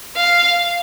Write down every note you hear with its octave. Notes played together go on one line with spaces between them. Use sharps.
F5